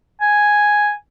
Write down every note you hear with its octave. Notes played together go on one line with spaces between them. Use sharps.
G#5